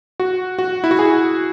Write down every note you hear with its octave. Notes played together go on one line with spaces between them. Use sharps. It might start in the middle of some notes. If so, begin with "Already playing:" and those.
F#4
F#4
E4
F#4
G#4